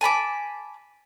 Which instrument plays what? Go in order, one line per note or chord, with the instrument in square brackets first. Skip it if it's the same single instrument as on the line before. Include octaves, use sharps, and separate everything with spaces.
[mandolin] G#5 A5 B5 D6